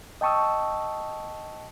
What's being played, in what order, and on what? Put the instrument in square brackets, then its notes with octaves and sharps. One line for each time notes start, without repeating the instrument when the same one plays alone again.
[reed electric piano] D#5 G5 A5 C#6 D#6 E6